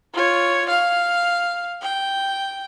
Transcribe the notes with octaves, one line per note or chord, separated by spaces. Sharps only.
F4 C#5
F5
G5